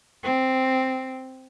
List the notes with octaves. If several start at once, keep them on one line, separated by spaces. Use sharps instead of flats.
C4